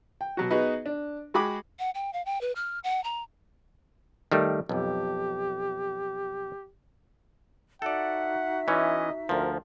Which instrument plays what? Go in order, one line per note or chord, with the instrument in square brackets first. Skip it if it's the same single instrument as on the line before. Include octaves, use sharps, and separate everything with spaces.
[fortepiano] G5
B2 F#3 F#4
B3 D#4 F#4 G#4 B4 D#5
D4
G#3 F#4 G#4 G5 B5 D6
[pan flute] F#5
G5
F5
G5
B4
F6
F#5
A#5
[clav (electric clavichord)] D#3 G3 A3
[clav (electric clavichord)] B1 F2 [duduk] G4
[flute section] D#4 F#4 E5 [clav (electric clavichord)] A4 D5 [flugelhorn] F#5
[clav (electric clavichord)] E3 C#4 [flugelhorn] D#5
[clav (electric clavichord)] D2 F3 [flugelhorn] A#4